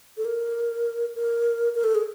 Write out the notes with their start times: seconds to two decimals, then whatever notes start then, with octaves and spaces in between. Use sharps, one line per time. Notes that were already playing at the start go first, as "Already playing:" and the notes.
0.17 A4
0.25 A#4
1.15 A#4
1.74 A#4
1.84 A4
1.95 G#4